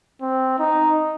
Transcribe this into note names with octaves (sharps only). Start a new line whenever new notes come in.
C4
D#4